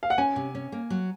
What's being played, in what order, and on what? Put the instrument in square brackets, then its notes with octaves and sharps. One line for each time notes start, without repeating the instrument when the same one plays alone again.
[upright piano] F5
F#5
[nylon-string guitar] C#4 [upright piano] G#5
[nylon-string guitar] C3
C#4
A#3
F#3